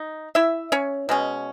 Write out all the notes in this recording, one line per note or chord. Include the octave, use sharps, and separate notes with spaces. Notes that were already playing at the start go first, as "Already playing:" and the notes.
Already playing: D#4
E4 E5
C#4 C#5
B2 G#3 C#4